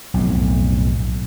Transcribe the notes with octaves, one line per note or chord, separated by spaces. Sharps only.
B1 F2 A2